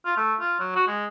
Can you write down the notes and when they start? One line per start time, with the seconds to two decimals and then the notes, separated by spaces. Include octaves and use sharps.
0.06 F4
0.17 A3
0.40 F4
0.60 F#3
0.76 F#4
0.87 G#3